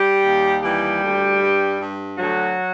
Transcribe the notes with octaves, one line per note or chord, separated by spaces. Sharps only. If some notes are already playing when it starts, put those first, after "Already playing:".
Already playing: G3 G4
D#2
E3 G3 G4
D2
G2
G2
D2 F#3 F#4